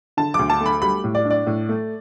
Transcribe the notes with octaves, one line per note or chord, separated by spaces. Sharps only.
D3 A5
D2 D6
A5
A3
B5
G3 B5
A2
D5
D4
D5
A2
A3